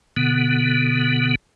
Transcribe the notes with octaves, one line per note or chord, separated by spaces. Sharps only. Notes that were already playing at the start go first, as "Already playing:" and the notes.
B2 D3 B3